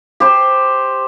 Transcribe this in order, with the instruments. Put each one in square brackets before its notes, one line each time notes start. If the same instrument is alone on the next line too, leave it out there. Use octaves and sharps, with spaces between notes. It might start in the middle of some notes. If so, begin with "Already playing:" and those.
[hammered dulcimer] G4 C5